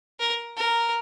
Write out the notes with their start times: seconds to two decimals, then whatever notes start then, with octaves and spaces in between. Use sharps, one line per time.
0.20 A#4
0.57 A#4